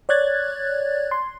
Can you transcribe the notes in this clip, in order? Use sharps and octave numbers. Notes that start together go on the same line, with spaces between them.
C#5 D5 F#6 G#6 A6
C6